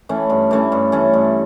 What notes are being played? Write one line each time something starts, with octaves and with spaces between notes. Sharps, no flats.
E3 A3 C#4
G2
E3 A3 C#4
G2
E3 A3 C#4
G2